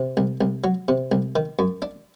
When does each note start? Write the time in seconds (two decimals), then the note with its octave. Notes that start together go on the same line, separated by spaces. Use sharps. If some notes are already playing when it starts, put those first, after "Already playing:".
Already playing: C3
0.17 C2
0.41 C2
0.64 F#3
0.88 C3
1.12 C2
1.36 D#3
1.59 F#2
1.82 D4